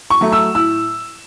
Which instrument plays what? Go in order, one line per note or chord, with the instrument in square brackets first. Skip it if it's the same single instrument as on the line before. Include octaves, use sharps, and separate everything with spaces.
[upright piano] C#6
F#3 A3
E6
A2 E6